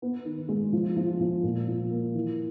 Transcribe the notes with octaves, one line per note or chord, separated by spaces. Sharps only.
B3
D#3
G#3
F3
F3
F3
A#2
F3
A#3
E3